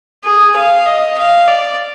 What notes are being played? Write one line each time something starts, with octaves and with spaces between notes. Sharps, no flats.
G#4
F5
D#5
F5
D5